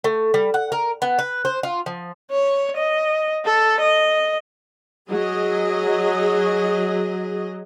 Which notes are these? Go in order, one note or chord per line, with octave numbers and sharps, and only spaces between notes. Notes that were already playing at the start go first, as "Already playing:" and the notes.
A3
G3
F#5
A#4
B3
B4
C5
F4
F3
C#5
D#5
A4
D#5
F#3 G#4 D#5